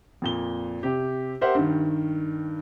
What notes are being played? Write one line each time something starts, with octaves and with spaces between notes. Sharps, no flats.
F2 A#2 G7
C3 G4
G4 A#4 C5 E5 F#5
G2 D#3